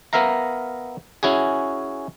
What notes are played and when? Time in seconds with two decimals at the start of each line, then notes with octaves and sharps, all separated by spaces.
0.13 B3 A#4 E5 F5 A#5
1.23 C#4 E4 F#4 G#4